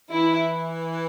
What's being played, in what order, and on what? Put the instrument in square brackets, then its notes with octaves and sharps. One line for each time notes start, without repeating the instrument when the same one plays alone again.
[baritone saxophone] E3 [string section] E4